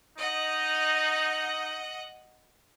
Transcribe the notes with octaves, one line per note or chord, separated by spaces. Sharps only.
D#4 D#5 F#5